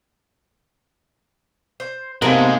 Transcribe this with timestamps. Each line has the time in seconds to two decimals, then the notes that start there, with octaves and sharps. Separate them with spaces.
1.80 C5
2.22 G#2 C3 G#3 A#3 B3 A5